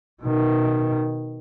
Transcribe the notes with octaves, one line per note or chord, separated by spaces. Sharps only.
B2 D#3